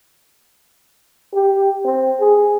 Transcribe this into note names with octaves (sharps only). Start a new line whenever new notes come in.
G4
C4
G#4